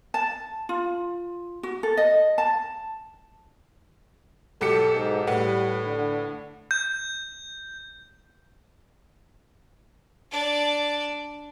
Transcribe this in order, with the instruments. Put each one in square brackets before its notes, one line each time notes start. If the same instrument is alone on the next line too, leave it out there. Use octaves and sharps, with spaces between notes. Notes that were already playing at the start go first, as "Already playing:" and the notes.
[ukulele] A5
F4
F#4
A4
D#5
A5
[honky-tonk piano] B1 G4 C#7 [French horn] A4
[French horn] G#2
[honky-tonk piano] A2 B4 F#5 [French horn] G3
[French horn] D3
[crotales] G6
[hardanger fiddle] D4 D5